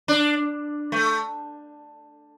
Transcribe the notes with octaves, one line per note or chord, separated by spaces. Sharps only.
D4
A3